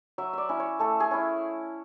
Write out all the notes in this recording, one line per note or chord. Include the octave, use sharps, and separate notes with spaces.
F#3 E5
D5 E5
C#4 E4
C#5
A3 A4
G#4
C#4 E4